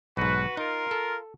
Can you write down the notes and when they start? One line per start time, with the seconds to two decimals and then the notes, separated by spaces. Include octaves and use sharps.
0.17 B1 G#2 F#4 B4
0.57 D#4 F4 A#4
0.91 A4